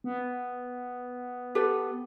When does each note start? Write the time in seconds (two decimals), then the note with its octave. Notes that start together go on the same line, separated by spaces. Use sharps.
0.04 B3
1.55 G4 A4 B4